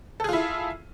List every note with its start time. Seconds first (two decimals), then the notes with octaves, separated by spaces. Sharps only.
0.20 A4
0.24 G#4
0.29 F4
0.33 E4